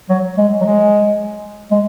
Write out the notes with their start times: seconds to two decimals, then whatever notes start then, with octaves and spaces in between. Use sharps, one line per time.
0.09 F#3
0.38 G#3
0.61 F#3
0.65 G#3
1.71 G#3